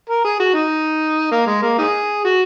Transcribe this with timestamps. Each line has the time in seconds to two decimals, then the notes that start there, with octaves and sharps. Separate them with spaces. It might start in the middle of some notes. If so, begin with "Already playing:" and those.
0.09 A#4
0.24 G#4
0.40 F#4
0.54 D#4
1.32 A#3
1.47 G#3
1.63 A#3
1.79 D#4 G#4
2.25 F#4